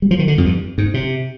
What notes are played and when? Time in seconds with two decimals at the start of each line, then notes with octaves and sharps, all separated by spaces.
0.02 G3
0.11 F3
0.19 D#3
0.28 D3
0.38 F2
0.45 G2
0.78 G#2
0.94 C3